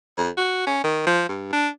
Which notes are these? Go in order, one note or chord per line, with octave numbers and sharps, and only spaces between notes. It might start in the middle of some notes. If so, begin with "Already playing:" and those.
F2
F#4
C#4
D#3
F3
G2
D4